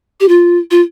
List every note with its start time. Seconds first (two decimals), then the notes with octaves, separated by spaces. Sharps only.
0.20 G4
0.28 F4
0.71 F4